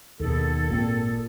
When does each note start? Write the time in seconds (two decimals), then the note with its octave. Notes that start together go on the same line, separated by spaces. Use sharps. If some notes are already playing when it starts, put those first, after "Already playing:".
0.20 D#2 B2 D#3 G#4 A4
0.69 G#1 A#2 A#3 C4